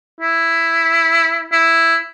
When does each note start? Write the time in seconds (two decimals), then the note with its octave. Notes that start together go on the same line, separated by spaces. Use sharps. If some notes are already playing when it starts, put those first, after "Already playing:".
0.21 E4
1.52 E4